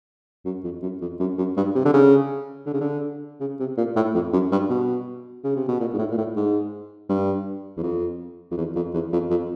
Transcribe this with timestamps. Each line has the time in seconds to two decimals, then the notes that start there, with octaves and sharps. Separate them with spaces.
0.45 F#2
0.64 F2
0.82 F#2
1.01 F2
1.20 F#2
1.38 F#2
1.57 G2
1.75 C3
1.85 D3
1.93 C#3
2.66 D3
2.74 C#3
2.80 D3
3.41 C#3
3.60 C3
3.78 A#2
3.96 A2
4.14 F2
4.33 F#2
4.52 G2
4.70 B2
5.44 C#3
5.56 C3
5.69 B2
5.80 A#2
5.94 G#2
5.99 A2
6.11 A#2
6.18 A2
6.36 G#2
7.09 G2
7.77 E2
7.83 F2
8.51 F2
8.57 E2
8.75 F2
8.94 E2
9.12 F2
9.30 F2